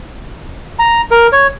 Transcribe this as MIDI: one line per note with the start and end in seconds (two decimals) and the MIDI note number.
0.79 1.02 82
1.11 1.27 70
1.32 1.47 73